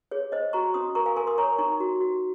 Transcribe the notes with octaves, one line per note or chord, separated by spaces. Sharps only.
G#4 C#5
C5 D#5
F#4 A#5 C#6
C#4 C6 D#6
A#4 A#5 C#6
F5 G#5
A#4 G#5 C6
C6 D#6
C#5 A#5 C#6
D#4 A#5 C#6
F#4
F#4